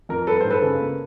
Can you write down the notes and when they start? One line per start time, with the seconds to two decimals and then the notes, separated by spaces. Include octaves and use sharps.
0.09 F2 A#4
0.27 G3 A4 B4
0.40 G#2 C5
0.50 A4 B4
0.62 C#3
0.80 A#3